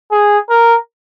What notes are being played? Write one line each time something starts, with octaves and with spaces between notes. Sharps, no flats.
G#4
A#4